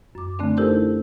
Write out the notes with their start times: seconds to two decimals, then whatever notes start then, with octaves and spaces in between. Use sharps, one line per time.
0.15 F#2 D6
0.39 D3 A3 C4 D4
0.57 D#4 E4 G4 A4 A#4 C5